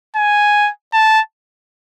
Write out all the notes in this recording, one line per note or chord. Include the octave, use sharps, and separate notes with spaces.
G#5
A5